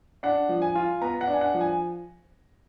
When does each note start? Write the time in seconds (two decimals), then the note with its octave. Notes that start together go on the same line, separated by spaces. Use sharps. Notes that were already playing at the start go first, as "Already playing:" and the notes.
0.23 D4 F#5
0.49 F3
0.62 G#5
0.75 F4
1.01 B3 A#5
1.21 F#5
1.27 D4
1.34 G#5
1.41 F#5
1.54 F3
1.61 G#5